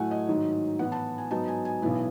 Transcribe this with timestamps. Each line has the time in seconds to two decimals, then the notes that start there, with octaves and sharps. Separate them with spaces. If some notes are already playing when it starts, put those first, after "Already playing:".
Already playing: A2 F#3 A3 E4 F#5 G#5
0.11 D#5
0.28 G#2 D#3 F#3
0.79 A2 E3 B3 F#5
0.92 A5
1.18 G#5
1.31 G#2 F#3 B3 D#4 A5
1.48 G#5
1.65 G#5
1.82 B1 A2 E3 B3 E4